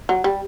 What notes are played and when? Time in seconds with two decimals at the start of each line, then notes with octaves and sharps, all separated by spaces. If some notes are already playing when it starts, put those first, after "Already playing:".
0.09 F#3
0.24 G3